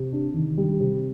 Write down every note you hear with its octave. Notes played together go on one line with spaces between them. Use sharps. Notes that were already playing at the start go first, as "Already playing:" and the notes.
Already playing: C3
D4
D#3
G3
C3